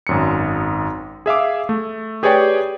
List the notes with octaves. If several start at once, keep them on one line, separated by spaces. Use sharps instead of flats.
G#1 F#2 C#7
G#4 E5 F5 D6
A3
G4 G#4 B4 C#5 D5 G5